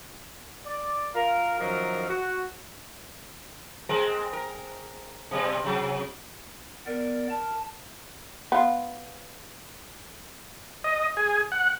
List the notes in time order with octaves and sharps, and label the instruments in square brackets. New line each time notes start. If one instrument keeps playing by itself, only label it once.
[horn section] D5
F4 A#4
F#2 D#3 F3 F#3 A#4
F#4
[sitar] G#3 C4 A#4
A#4
B2 G3 C4
C3 F#3
[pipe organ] B3 D5 [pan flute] A#4
[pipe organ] A5
[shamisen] B3 F4
[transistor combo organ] D#5
G#4
F#5